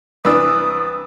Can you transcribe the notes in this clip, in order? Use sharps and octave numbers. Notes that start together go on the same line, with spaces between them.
C2 E3 D4 B4 D#6 E6